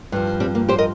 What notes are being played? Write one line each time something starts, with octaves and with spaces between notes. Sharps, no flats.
G2 F3
G3 C4
A#3
G4 C5
A#4 D#5